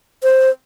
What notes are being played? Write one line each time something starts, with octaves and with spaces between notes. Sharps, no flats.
C5